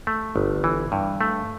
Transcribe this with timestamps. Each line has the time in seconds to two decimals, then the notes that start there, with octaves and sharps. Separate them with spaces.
0.07 A3
0.36 G1
0.64 E3
0.92 G2
1.21 A3